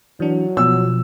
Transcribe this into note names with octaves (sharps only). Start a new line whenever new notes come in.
E3 F#3 D4
B2 F3 E6